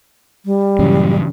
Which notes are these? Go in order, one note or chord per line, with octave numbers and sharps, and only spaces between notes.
G3
G2 A#2 C#3 E3 F#3 C#4